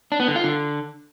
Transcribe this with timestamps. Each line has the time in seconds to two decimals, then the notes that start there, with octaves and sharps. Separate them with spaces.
0.12 D4
0.20 B3
0.28 D3
0.36 F4
0.44 D3